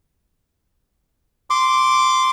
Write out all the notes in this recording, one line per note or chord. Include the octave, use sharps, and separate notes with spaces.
C6 D6